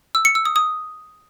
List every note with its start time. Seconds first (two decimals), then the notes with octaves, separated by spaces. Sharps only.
0.15 E6
0.25 C#7
0.35 E6
0.45 D#6
0.56 D#6